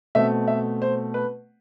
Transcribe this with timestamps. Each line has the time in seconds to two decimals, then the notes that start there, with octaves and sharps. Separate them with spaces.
0.15 B2 A3 C4 E5
0.48 E5
0.82 C5
1.14 B4